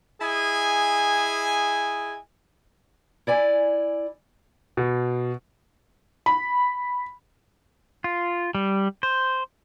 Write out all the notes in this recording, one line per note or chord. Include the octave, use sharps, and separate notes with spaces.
E4 G#4 D#5 G#5
E4 D5 G#5
B2
B5
F4
G3
C5